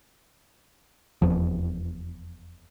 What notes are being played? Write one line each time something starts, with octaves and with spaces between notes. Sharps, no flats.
F1 E2 F3